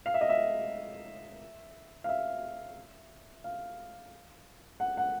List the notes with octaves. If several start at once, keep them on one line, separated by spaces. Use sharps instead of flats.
F5
E5
D#5
E5
F5
E5
F5
F#5
F#5